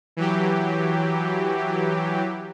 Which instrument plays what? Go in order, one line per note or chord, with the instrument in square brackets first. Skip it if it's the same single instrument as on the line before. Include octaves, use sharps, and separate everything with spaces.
[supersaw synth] E3 F#3 G4